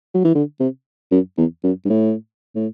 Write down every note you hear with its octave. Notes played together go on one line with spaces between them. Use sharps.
F#3
E3
D3
C3
F#2
E2
F#2
G2
A2
A2